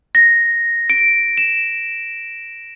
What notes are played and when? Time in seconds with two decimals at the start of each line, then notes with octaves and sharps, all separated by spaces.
0.15 A#6
0.90 D7
1.37 E7